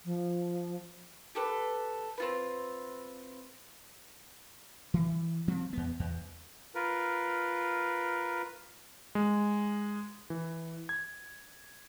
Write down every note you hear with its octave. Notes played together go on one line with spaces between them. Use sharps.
F3
G4 A4 B4
C4 F4 B4
E3
F3 G3 C4
E2 B3
E2
F4 A#4 B4
G#3
E3
G#6